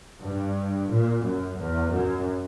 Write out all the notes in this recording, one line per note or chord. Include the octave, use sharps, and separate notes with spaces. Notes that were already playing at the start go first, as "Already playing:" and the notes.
G2
A#2
F#2
E2
F#2